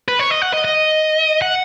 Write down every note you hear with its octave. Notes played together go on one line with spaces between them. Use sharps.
B4
C#5
D#5
F#5
D#5
D#5
F#5